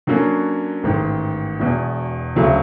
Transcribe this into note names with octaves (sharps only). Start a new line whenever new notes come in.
D3 F#3 A#3 C#4
A1 G#2 D#3
E1 E2 B2
D2 C#3 F#3 A3